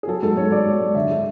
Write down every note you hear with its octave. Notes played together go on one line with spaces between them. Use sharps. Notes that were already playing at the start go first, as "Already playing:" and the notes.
G#4
F#3 A4
G#2 A4
G#2 C#5
F#3 D5
G#2
G#2
D3 E5
G#3